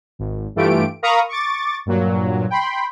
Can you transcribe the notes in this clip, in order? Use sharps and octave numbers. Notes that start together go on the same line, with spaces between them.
G#1
G2 E3 A3 F4 G4 D7
A#4 F5 A#5 B5 C#6 D#6
C#6 D6 A6
G2 A#2 F#3
G5 B5 C6